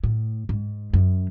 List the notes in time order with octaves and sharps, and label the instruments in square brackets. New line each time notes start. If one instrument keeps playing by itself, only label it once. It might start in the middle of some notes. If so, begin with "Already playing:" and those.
[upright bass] A2
G#2
F#2